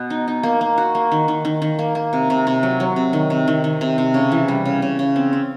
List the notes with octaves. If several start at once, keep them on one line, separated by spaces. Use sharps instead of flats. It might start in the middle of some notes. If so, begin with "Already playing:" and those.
Already playing: B2 B3
D#4
D#4
A#3
A#3
F#4
A#3
D#3
D#3
D#3
D#3
A#3
A#3
C3
C3
C3
F#3
F#3
C3
D#3
C3
D#3
D#3
C3
C3
C#3
E3
G3
C#3
C#3
C#3
C4
C4